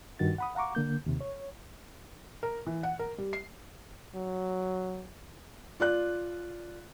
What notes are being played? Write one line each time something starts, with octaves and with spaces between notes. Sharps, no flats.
G2 D#3 F#4 A6
F#5 B5 D#6
F5 F#5 A#5 C#6 D6
D3 A#3 G6
D#2 C3
C#5
A#4
E3
F#5
A#4
G3
C7
F#3
F4 D5 F#6